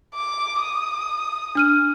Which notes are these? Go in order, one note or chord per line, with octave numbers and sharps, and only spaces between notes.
D6
D#6
D4 F6 D#7